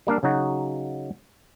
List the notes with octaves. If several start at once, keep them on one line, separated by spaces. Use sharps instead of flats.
G3 A#3 D4 F5
C#3 F#3 D#4 F#4